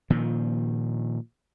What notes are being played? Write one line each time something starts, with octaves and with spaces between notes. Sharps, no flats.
A#2 D#3 F3